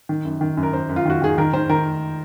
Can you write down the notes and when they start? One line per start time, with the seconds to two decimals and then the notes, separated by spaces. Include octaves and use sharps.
0.09 D#3
0.25 F#2
0.41 D#3
0.57 F#2
0.63 A#4
0.73 F#2 C5
0.89 F#2
0.96 F4
1.05 D#3 F#4
1.22 D#3 G#4
1.38 D#3 A#4
1.53 D#3 C5
1.69 D#3 A#4